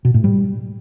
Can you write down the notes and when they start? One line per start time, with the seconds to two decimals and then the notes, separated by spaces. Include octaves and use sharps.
0.05 B2
0.14 A2
0.24 G3